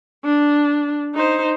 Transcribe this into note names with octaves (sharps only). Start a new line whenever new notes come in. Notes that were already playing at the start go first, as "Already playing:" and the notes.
D4
D#4 C5